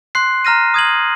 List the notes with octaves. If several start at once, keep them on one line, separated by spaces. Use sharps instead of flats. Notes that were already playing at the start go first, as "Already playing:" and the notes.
C6 F#6 C7
A#5 F6 A#6 D#7
D#6 G#6 D#7 F#7